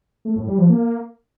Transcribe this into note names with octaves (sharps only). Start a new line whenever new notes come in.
A3
A2
G3
F3
A#3